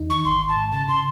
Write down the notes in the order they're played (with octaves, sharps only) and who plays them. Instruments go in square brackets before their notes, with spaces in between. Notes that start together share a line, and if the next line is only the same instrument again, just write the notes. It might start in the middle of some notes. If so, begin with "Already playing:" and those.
Already playing: [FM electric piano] E2 D#4
[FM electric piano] D#3 [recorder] C#6
[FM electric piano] G#1 [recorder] C6
[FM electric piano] G#1
[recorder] A5
[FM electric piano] G#2
[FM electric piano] C#3 [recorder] A5
[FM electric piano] C#3 [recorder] C6